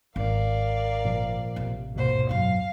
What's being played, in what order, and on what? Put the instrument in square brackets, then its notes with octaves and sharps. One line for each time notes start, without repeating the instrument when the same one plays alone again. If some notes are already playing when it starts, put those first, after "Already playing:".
[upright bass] G#1 [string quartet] A#4 D5 F5
[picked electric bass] A#2 F3
[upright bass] A1 C3
[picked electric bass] D2 G#2 B2 [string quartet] A#3 C5
[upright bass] F#2 [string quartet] F5